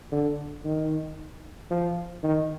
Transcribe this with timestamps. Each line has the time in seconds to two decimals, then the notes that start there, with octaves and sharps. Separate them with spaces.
0.12 D3
0.65 D#3
1.70 F3
2.23 D#3